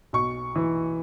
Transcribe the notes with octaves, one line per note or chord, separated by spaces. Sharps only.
B1 C#6
E3